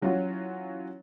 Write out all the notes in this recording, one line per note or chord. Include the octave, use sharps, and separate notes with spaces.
E3 F#3 C#4 F4 F#4